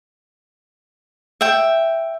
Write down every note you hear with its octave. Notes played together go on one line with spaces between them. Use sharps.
E5 G5